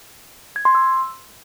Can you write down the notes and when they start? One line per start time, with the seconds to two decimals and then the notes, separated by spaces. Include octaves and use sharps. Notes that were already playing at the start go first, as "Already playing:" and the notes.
0.56 G#6
0.65 C6
0.75 E6